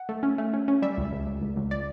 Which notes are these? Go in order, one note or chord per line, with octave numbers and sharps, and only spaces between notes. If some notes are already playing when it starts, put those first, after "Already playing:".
Already playing: F#5
A3
C#4
A3
C#4
C#4
G3 E5
C#2
C#2
C#2
C#2
C#2
D5